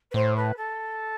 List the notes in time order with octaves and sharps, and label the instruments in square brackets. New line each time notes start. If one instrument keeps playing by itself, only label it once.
[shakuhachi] B4
[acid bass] A2 [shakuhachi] C5
[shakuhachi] B4
A4